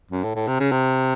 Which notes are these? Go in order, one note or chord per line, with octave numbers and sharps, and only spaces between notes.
F#2
A2
A2
C3
C#3
C3